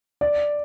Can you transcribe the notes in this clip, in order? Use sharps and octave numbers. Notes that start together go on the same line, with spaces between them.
D5